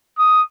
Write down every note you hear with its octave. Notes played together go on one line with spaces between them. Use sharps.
D#6